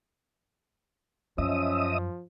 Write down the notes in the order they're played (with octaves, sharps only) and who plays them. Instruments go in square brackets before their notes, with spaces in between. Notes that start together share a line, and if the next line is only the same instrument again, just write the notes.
[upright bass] F#2 [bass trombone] F3 [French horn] C#4 [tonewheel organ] D#5 E5 D#6